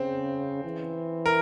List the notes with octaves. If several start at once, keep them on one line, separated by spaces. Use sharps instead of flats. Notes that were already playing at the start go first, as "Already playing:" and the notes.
Already playing: C#3 C4
E3
A#4